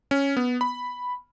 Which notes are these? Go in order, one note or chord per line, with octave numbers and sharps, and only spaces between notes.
C#4
B3
B5